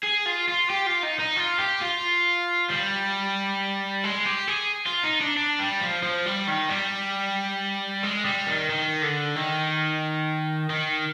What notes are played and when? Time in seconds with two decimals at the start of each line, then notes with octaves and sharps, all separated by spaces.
0.03 G#4
0.26 F4
0.48 F4
0.70 G4
0.87 F4
1.03 D#4
1.20 D#4
1.37 F4
1.59 G4
1.81 F4
2.69 G3
4.04 G#3
4.26 G4
4.47 G#4
4.86 F4
5.03 D#4
5.21 D4
5.37 D4
5.59 G3
5.81 F3
6.03 F3
6.26 G3
6.48 D#3
6.70 G3
8.03 G#3
8.25 G3
8.47 D#3
8.70 D#3
9.02 D3
9.36 D#3
10.70 D#3